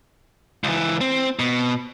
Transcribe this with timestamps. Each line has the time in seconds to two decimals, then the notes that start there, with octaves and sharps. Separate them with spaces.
0.64 C#2 E3
1.01 C4
1.39 B2